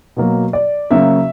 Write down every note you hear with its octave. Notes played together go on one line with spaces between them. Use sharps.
B2 F#3 A#3
D5
C#3 F#3 A#3 E5